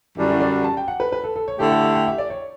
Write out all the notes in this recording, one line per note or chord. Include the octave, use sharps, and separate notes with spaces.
F#2 D3 G3 D4 E4 F#4
E4
D5
A5
G5
F#5
B4
B4
A4
A4
C#5
D3 A3 E4 G4 A4
F#5
G5
F#5
E5
D5
C#5